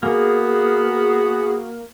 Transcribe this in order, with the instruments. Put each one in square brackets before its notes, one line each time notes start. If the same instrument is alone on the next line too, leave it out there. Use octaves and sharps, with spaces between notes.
[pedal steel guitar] A#3 [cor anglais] B3 [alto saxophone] F#4 [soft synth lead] G#4